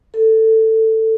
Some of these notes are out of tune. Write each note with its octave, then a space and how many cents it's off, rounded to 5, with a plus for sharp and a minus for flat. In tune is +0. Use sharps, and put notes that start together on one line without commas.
A4 +15